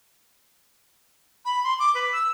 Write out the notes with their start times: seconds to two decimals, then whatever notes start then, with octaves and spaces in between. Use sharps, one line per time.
1.45 B5
1.64 C6
1.79 D6
1.95 B4
2.12 E6